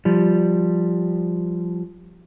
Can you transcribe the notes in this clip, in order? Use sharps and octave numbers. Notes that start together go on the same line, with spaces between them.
F3 G3